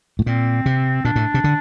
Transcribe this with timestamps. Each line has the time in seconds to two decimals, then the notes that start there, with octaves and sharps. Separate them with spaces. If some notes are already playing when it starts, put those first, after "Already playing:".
0.19 A2
0.26 A#2 C4
0.66 C3
1.05 A#2 D4
1.16 A2
1.34 C3
1.44 D3